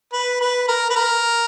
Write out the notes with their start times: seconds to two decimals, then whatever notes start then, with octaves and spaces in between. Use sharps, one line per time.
0.13 B4
0.41 B4
0.68 A#4
0.90 B4
0.96 A#4